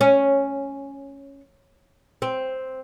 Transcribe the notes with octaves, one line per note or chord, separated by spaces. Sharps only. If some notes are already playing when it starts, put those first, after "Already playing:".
C#4
C4